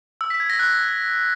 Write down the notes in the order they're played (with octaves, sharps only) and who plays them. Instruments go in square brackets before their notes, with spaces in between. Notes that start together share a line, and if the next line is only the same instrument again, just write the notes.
[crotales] E6
B6
G#6
A#6
F#6